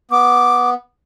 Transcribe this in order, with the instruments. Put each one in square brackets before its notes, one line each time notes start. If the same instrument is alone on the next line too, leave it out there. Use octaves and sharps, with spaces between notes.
[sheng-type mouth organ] B3 [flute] D6